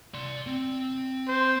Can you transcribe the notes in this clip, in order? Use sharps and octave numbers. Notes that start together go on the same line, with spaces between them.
D5 C6
C4
C5